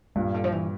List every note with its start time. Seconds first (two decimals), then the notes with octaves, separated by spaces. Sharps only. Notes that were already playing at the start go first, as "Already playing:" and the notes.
0.15 G2 A#2 C#3
0.34 D3
0.44 F3
0.52 E3